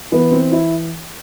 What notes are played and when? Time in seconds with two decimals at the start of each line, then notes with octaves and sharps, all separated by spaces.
0.12 E3 B3
0.32 C4
0.52 E4